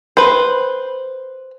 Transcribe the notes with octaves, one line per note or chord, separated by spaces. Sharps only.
B4 C5